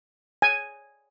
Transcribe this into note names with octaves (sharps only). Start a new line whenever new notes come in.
G#5